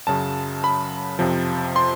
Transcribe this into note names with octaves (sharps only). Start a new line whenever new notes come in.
F#2 C#3 F#3 A5
B5
F2 C3 F3
C6